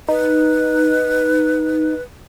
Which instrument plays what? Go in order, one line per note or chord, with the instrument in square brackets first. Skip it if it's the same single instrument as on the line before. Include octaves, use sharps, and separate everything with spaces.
[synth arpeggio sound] D#4 [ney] B4